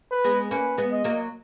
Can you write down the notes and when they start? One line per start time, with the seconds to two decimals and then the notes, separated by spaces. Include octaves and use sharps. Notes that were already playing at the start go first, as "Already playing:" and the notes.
0.12 B4
0.24 G#3 B3
0.51 A#3 C#4 B4
0.78 G#3 B3
0.92 D#5
1.04 F#3 A#3